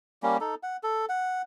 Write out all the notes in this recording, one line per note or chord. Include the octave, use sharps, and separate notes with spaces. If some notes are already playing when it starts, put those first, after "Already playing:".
G3 A#3 C#4
D#4 A4
F#5
A4
F#5